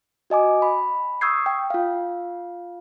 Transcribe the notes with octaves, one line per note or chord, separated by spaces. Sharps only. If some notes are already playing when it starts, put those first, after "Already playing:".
F#4 D#5 G#5 D6
B5
C#6 D#6 E6 G6 G#6 C7
G5
F4 F5